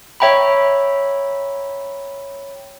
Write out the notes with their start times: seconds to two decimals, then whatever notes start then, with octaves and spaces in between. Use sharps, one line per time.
0.20 C#5 E5 G5 A#5 B5